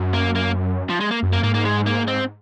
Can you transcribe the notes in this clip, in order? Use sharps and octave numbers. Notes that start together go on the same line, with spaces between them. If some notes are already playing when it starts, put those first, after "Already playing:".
Already playing: F#2
A#3
A#3
F3
G#3
A#3
F#2
A#3
G#2 A#3
A#3
G#3
A#3
C4